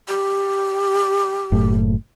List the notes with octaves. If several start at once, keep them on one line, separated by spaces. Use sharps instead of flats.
G4
F#1 A2